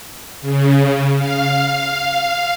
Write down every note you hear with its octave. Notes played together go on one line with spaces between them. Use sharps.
C#3
F5